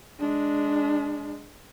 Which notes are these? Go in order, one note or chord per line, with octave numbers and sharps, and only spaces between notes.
G#3 D4